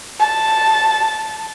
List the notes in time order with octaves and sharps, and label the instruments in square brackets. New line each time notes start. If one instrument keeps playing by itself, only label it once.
[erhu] A5